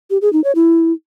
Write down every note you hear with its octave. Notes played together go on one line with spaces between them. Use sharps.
G4
G#4
D#4
C#5
E4